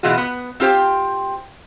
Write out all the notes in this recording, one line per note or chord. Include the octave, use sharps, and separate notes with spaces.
B2 E3 G#3 F4 F#4
B3
C4 F4 G4 C5 G5